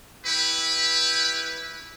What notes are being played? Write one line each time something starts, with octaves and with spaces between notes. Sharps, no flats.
E4 G4 B4